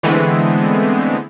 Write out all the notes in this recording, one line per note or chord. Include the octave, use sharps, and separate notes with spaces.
D3 E3 G#3 A3 B3 C4